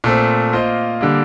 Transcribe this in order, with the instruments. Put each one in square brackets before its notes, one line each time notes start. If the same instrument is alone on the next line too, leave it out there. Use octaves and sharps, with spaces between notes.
[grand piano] A#2 A3 C4
A#3 F4 C5 D#5
D3 G3 A#3